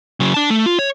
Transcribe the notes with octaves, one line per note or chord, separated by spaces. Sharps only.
C#3 F#3
D4 A5
A3
F4
C#5